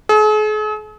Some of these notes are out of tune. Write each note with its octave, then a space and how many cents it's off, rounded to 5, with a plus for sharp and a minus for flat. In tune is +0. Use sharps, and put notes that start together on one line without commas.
G#4 +45